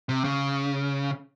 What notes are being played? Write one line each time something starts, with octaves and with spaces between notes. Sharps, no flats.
C3
C#3